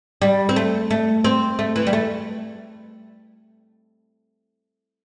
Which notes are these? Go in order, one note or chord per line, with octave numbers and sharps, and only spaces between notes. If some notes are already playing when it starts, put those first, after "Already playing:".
G3
C4
A3
A3
C4
A3
E3
G3
A3